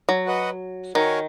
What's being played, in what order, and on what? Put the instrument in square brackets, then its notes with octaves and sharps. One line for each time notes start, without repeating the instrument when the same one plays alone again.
[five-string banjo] F#3
[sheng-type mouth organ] F#4 B4 D#5 F#5
[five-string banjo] D#3 [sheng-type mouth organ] F#4 A#4 C#5 G#5